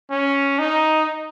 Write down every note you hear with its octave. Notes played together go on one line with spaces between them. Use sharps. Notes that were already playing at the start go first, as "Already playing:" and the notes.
C#4
D#4